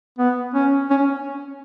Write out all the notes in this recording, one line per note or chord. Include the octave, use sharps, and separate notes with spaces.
B3
C#4
C#4